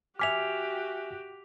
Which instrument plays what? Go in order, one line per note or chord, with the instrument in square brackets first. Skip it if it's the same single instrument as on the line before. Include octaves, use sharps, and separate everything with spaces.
[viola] F#4 G4 [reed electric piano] E5 G#5 F6 [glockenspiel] D6 B6 F7